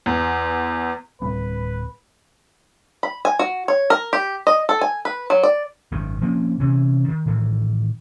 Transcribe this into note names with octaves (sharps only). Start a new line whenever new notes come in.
E2
D1 G3 C4 B4
B5
G#5
F#4
C#5
A#4
G4
D#5
A4
G#5
B4
F#3
D5
G#1 F#2 D#3
F3 A#3 C4 C#4
C3 E3 C#4
D#3
A2 D#3 E3